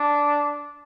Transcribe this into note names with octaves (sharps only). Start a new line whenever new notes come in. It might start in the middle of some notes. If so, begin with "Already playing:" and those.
Already playing: D4